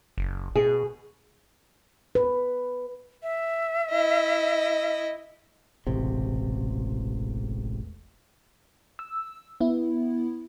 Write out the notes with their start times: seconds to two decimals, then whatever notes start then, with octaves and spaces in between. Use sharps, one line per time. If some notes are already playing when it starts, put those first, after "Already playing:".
0.18 F#1
0.56 B2 G#4
2.15 B4
3.23 E5
3.90 E4 D#5
5.87 E1 A1 C3
8.99 E6
9.61 B3 E4